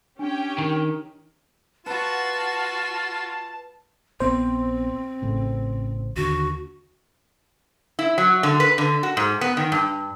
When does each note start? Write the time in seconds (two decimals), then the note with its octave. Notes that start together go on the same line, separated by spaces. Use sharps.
0.19 C#4 D4 G4 G5
0.58 D#3
1.86 F4 F#4 B4 F#5 A5 E7
4.20 A#1 B3 C4 C5
5.22 A1 A2 C#3
6.16 D#2 D3 F#4
7.99 E4
8.18 F#3
8.43 D3
8.60 B4
8.78 D3
9.03 F#4
9.17 G#2
9.41 B3
9.57 D#3
9.72 G2